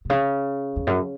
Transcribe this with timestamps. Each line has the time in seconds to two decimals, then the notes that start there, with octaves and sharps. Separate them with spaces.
0.05 B2
0.10 C#3
0.76 E2
0.87 F#2